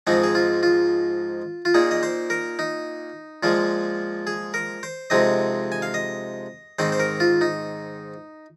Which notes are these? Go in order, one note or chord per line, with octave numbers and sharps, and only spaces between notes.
G#2 F3 G#3 C4 D#4
G#4
F4
F4
F4
A#2 A#3 D#4 G#4
D#5
C5
A#4
D#4
A#2 F3 G#3 F4
G#4
A#4
C5
F2 C3 G#3 C4 D#4 D#5
G#5
F5
D#5
G#2 D#3 C4 D#4 C5
C5
A#4
F4
D#4